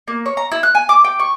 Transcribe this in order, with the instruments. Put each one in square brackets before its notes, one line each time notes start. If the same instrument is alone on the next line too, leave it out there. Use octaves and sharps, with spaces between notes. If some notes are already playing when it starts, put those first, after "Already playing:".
[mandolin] A#3
C#5
A#5
E4
F#6
G#5
D6
G5
C#6